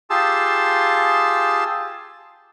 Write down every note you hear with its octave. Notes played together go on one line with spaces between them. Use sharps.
F4 G4 G#4 A5 C6 E6